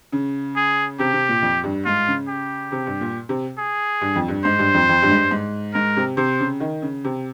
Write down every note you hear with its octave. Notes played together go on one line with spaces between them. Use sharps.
C#3
G#4
C3 G4
C3
A#2
F2
G2
G#2 F4
C#3
G4
C3
G2
A#2
C3
G#4
G2
F2
G2
G#2 C5
G2
F2
F2
G2
G#2
G2
G#2
G#2 A#4
C3
C3 C5
C#3
D#3
C#3
C3